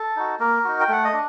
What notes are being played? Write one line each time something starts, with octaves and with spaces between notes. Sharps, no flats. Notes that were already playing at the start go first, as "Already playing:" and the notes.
Already playing: A4
D#4 F#4
A#3 A#4
D#4 F#4
G5
A3 F#5
D#5
D4